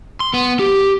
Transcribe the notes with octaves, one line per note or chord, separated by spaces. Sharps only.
C6
B3
G4